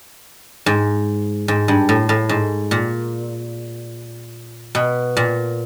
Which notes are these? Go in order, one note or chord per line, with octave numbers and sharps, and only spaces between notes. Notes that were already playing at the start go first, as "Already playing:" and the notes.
G#2
G#2
G2
A2
A2
G#2
A#2
B2
A#2